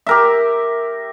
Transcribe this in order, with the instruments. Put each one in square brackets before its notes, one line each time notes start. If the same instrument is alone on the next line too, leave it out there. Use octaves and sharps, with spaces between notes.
[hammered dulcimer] G4 A#4 E5